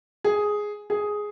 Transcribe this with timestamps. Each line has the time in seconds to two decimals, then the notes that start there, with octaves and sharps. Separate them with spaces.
0.24 G#4
0.90 G#4